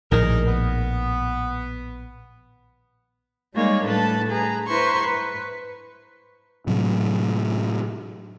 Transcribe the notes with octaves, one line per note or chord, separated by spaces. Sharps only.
A#1 A2 D#3 D#4 G#4 A#4
B3
G3 G#3 A#3 D#4 C#5 D5
A2 G3 D4 A4 B4 A5
G#4 B4 A#5
E4 B4 C5 A#5 C6 C#6
B4
A2 C3 F#3